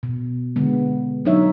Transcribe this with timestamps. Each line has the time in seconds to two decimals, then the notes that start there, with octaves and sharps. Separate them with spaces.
0.03 B2
0.56 D3 G#3 B3
1.25 F#3 D4 D#4 C#5 E5